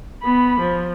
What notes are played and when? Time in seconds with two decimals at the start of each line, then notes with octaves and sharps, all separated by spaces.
0.22 B3 B5
0.61 F3